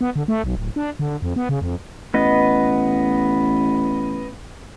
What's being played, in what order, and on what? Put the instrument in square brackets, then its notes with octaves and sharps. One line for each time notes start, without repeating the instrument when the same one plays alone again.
[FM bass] B3
D3
A3
B1
D1
D4
D3
F2
B3
C#3
F2
[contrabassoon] A1 [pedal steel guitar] B3 D#5